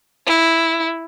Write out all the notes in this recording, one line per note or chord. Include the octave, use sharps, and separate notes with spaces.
E4